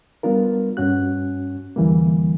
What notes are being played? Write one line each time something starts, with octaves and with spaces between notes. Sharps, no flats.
G3 B3 D4 F4 A#4
G2 C#4 F#4 F#6
E2 D3 E3 G3 A#3